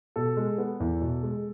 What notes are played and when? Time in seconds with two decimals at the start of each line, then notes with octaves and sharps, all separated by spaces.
0.16 B2 A4
0.37 G#3
0.58 B3
0.80 E2
1.02 B2
1.23 G#3